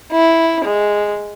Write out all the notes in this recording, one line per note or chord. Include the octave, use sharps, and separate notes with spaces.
E4
G#3